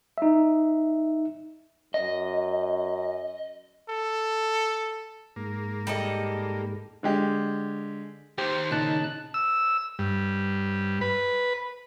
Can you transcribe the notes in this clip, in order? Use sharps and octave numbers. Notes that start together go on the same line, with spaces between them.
D#4 E5
F#2 D#5
A4
G#2 A#3
G3 A4 D#5
D3 G#3 G4
D#2 D#3 G4 C5
A#2 C#3 D#4 A5 F#6
E6
G2
B4